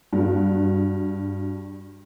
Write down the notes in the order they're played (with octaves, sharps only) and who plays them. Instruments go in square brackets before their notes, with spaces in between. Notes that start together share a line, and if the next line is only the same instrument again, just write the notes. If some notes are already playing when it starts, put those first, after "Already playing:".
[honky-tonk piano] G2 F#4